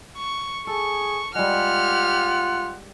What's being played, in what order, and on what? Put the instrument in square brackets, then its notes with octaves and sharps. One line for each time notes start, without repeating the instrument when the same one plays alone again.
[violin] C#6
[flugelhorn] G#4 [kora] A4 [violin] C#6
[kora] G3 G#3 [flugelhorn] F4 [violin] G4 F6 [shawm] F#5